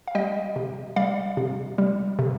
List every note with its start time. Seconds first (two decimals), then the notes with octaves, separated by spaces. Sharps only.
0.08 F5
0.15 G3 D#5 G5
0.56 C3
0.96 G3 D5 F5
1.37 C3
1.78 G3
2.19 C3